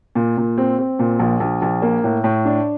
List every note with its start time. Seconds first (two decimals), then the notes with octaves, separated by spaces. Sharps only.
0.15 A#2
0.37 A#2
0.58 C4
0.79 C4
0.99 A#2
1.19 A#1
1.40 A#1
1.62 A#1
1.82 A#3
2.04 A2
2.24 A2
2.45 D4